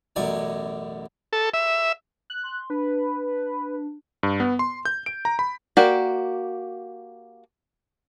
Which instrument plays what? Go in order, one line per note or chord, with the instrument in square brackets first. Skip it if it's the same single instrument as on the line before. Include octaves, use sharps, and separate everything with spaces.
[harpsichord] A1 F#2 B2 D5 G#5
[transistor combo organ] A4
E5
[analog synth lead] F#6
[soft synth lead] C6
[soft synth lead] D4 [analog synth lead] B4
[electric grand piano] G2
B3
C6
G6
D7
A#5
B5
[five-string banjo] A#3 F#4 G4 D5